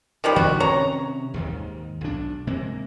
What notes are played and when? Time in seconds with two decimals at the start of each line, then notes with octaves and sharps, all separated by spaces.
0.24 D#3 F3 G3
0.36 D#3 E3 D4 F#4
0.60 C3 D#3 C#4 C#5 A#5
1.34 D#2 G#2 D#3
2.01 B1 D4
2.47 C3 G#3 A#3